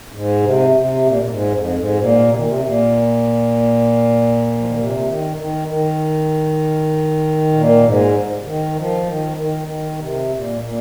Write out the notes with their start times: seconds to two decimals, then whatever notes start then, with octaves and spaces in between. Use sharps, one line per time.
0.12 G#2
0.43 C3
0.75 C3
1.05 A#2
1.22 A#2
1.28 G#2
1.51 F2
1.74 G#2
1.98 A#2
2.28 C3
2.37 D#3
2.44 C3
2.59 A#2
4.58 F3
4.66 D#3
4.75 C3
5.06 D#3
5.37 D#3
5.68 D#3
7.53 A#2
7.83 G#2
8.39 C3
8.45 D#3
8.75 F3
9.06 D#3
9.37 D#3
9.68 D#3
9.99 C3
10.30 A#2
10.61 A#2